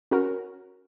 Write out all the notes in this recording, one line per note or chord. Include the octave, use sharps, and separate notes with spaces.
C#4 F#4 A#4